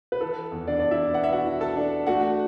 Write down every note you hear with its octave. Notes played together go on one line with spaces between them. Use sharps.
B4
E3 A4
E2
D4 D5
E2 D5
E4 E5
B3 F#5
E5
F#4 F#5
E3
A4 A5
D4
A3 F#4 F#5